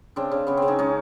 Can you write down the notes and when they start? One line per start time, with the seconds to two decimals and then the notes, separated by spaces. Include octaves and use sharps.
0.16 C#3 C4 D4
0.31 C#3
0.47 C#3 B3 C#4
0.57 C#3 C4
0.68 C#4 D#4
0.79 G#3 C#4 D#4